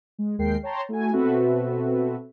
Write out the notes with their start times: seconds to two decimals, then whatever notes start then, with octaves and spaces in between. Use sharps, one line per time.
0.18 G#3
0.38 D#2 G#3 A#4 G5 C7
0.63 C#5 G5 A5 A#5 C6
0.89 A3 E4 F#4 G#5
1.13 B2 C4 F#4 A4 B4 E5